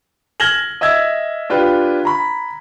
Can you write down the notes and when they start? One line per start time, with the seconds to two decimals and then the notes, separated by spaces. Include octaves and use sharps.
0.40 F6 G#6 A#6 E7 F#7 G7
0.81 D#5 E5 E6 G#6
1.50 D4 F4 G4 B4
2.05 A#5 B5